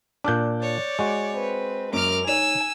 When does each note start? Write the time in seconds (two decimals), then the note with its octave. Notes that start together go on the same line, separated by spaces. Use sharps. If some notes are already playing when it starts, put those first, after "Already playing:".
0.24 A#2 D4 D6 F#6 G6
0.62 C#5 D5
0.99 G#3 F#4
1.33 C4 B4
1.93 F#2 A#4 D6 F6 F7
2.27 D#4 C#5 G#5 E6